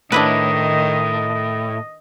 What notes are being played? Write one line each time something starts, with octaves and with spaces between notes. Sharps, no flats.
A2 D#3 D4 E4 B4 D#5